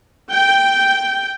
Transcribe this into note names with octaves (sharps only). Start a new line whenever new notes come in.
G5